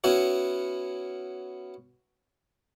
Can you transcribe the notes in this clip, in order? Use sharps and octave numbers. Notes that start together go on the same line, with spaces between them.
B3 C#4 E4 F#4